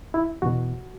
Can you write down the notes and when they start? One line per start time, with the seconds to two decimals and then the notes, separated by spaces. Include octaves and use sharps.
0.14 E4
0.42 E2 B2 F#4